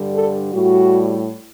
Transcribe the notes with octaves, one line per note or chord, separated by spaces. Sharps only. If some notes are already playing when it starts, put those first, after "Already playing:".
Already playing: G2 D3 G3
A4
A2 G3 F#4